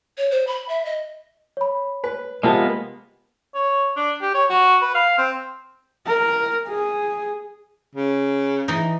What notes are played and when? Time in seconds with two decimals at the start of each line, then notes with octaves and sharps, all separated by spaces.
0.18 C#5
0.31 C5
0.47 B5
0.69 E5
0.85 D#5
1.57 C#5 B5
2.04 B4
2.43 C3 F3 G#3 A#3 B3 A#4 A5
3.55 C#5
3.97 D4
4.21 G4
4.35 C#5
4.50 F#4
4.81 B4
4.95 F5
5.18 C4
6.06 A#4
6.68 G#4
7.95 C#3
8.68 E3 D#4